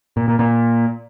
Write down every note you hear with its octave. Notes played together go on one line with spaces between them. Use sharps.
A#2
A#2
A#2